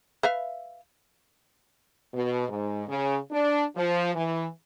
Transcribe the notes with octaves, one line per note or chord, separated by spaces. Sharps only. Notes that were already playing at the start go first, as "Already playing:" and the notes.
B4 E5 F5
B2
G#2
C#3
D4
F3
E3